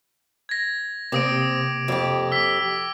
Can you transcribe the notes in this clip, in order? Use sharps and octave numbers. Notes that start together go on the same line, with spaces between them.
G#6 A#6
C3 A#3 C4 D6 D#6 D7
F2 G4
E6 B6